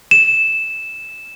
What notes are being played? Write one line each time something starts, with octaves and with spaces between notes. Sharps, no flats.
E7